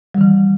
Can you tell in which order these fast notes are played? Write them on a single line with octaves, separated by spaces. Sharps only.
G3 D#3 E3